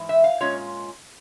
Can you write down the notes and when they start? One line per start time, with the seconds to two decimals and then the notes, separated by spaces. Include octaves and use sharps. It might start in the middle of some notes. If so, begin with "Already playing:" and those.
Already playing: G#2 E3
0.09 E5
0.24 F5
0.40 A#2 G#3 C#4 F4 C#5